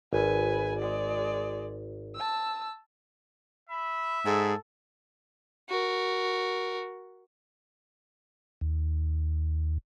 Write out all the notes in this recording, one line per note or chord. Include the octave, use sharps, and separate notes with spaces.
G#1 B4 G#5
G#3 D5
A5 E6
E5 B5
G#2 G#4 A4
F#4 A#4
D#2